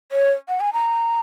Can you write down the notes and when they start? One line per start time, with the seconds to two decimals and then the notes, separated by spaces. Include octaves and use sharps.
0.12 C#5
0.49 F#5
0.60 G#5
0.73 A#5